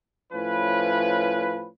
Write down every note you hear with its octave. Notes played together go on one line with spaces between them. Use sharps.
A2 F3 C#4 B4